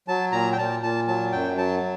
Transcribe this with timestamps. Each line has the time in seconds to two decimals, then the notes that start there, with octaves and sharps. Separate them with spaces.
0.08 F#3 A5
0.32 A#2 A#5
0.53 G5
0.58 A#2 A5
0.83 A#2 A5
1.07 F#3 A5
1.32 F#2 G5
1.57 F#3 A5